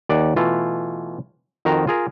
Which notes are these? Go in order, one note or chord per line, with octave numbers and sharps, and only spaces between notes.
D#2 D5 F#5
B2 E3 A3 F4
F2 D#3 F#4 A#4 C5 A#5
F4 G#4 A#4